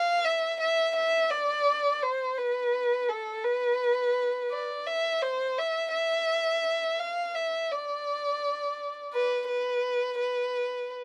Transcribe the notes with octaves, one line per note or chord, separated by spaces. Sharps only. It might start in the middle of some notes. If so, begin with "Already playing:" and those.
Already playing: F5
E5
E5
E5
D5
C5
B4
A4
B4
D5
E5
C5
E5
E5
F5
E5
D5
B4
B4
B4